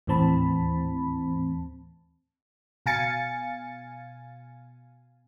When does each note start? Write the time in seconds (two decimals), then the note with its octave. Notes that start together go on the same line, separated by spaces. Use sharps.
0.07 D#2 A2 E3 C4 A5 B5
2.86 B2 F5 G#5 A6 C#7